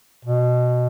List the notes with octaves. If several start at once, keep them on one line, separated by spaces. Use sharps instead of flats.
B2